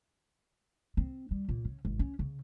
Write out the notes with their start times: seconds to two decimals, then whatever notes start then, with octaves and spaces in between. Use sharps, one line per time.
0.97 C4
1.31 G3
1.49 A#2
1.65 C#3
1.85 G#1
1.99 C#4
2.19 C#3